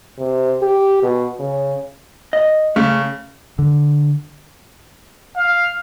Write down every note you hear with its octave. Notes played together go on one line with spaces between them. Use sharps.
C3
G4
B2
C#3
D#5
C#3 A3
D3
F5